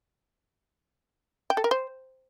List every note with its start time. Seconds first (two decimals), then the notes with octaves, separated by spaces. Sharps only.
1.50 G5
1.57 A4
1.64 A#4
1.71 C5